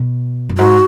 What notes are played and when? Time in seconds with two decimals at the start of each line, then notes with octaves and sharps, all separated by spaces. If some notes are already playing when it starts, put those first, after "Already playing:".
Already playing: B2
0.49 F#2
0.58 G#2 F#4